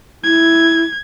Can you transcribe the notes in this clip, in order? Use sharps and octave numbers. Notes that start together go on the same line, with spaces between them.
E4 G#6